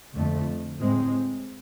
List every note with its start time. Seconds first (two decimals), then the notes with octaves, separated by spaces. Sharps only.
0.15 F2 D3 A3
0.80 A2 G#3 C4